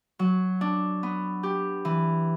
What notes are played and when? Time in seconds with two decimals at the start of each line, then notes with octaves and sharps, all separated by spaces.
0.19 F#3
0.61 D4
1.03 B3
1.43 G4
1.85 E3